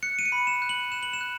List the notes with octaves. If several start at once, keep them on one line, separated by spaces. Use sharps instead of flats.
F#6 C#7
D#7
C#7
B5
E7
F#6
F#7
F#6 E7
F#7
E7
F#6